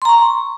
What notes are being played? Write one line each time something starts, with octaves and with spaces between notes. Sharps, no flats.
A#5 C6 C#6